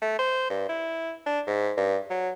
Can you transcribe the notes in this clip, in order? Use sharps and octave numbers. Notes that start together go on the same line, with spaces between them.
A3
C5
G2
E4
D4
G#2
G2
F#3